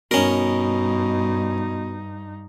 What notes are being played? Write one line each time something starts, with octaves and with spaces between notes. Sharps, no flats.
G2 B2 C#4 D#4 A#4